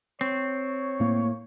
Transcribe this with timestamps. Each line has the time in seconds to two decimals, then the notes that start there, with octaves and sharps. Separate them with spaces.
0.21 C4 C#5
1.00 A2 A#3